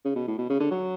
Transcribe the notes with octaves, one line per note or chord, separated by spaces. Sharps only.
C#3
B2
A2
B2
C#3
D3
F#3